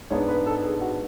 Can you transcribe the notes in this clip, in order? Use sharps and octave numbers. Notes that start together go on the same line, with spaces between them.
G#2 G#3 B3 D4 C#5
B4
A4
G#4
F#4